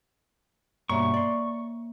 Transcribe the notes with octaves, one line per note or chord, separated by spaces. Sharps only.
G2 B2 A#3 C#5 E5 C#6
D5 C6